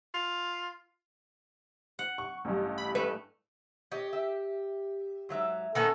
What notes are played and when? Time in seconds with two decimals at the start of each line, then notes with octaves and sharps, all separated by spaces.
0.14 F4
1.99 F#5
2.18 C#6
2.45 A1 G2
2.78 B5
2.95 A3 B4
3.92 G4 C#5 D#5
4.13 E5
5.29 G#2 F#3 E5
5.75 D#3 B3 C#4 A4 G#5 A5